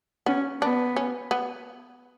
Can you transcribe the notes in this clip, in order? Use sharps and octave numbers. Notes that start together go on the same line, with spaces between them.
B3 C#4
B3 D4
C#4
B3